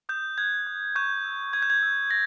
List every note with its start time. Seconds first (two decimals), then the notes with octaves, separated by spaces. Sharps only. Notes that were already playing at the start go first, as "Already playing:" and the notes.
0.09 D#6 G6
0.38 F#6 G#6
0.67 D#6
0.95 C#6 G6
1.25 E6
1.53 C#6 G#6
1.62 G6
1.70 G#6
1.83 E6
2.11 C#6 A#6